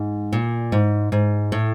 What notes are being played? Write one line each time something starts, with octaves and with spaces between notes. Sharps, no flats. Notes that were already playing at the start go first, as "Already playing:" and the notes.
Already playing: G#2
A#2
G#2
G#2
A2